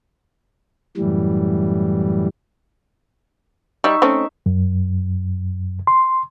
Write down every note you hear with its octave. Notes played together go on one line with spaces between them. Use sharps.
F#2 A2 E3 G3
G3 D#4 E5 C#6
A3 C4 C#4
F#2
C6